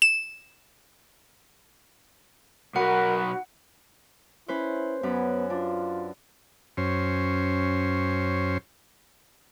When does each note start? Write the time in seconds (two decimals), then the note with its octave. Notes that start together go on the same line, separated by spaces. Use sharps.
0.02 E7
2.76 B1 F#4 A#4 B4 F#5
4.48 C#4 E4 B4 C5
5.03 F#2 B3 C#4 B4
5.50 D4 F4
6.77 F#2 C#4 C5